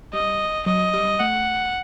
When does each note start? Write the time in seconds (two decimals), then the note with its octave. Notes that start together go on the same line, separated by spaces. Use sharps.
0.13 G3 D#5
0.66 F#3 D#5
0.93 G3
1.20 A3 F#5